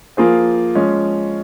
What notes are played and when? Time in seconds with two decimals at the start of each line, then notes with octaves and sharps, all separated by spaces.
0.17 F3 A#3 F4 G#4 C5
0.75 F3 G#3 C#4